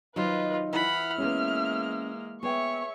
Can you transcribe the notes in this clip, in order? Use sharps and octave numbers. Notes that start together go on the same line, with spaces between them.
D#3 F#3 D#4 F4 B4 C5 D#5
E3 E5 F#5 B5 F6
G#3 A#3 B3 C#4
B3 G#4 C#5 E5 G5 C#6